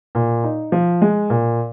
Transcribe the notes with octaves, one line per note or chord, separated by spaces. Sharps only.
A#2
D#4
F3
G#3
A#2